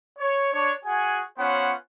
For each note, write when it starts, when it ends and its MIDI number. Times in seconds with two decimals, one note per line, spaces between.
0.18 0.51 73
0.53 0.72 62
0.53 0.72 73
0.85 1.23 66
0.85 1.23 68
0.85 1.23 78
0.85 1.23 80
1.38 1.74 59
1.38 1.74 61
1.38 1.74 65
1.38 1.74 72
1.38 1.74 73
1.38 1.74 78